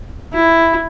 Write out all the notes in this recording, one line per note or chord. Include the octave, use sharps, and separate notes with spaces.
E4